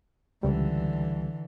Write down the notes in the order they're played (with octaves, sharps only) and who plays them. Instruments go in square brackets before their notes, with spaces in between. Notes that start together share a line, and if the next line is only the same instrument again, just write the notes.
[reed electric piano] C#2 G3 [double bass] D3 E3